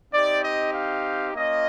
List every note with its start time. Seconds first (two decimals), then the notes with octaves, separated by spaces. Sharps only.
0.13 C4 D#4 G4 D5
0.44 D#5
0.74 F5
1.35 A#3 C#4 F4 D#5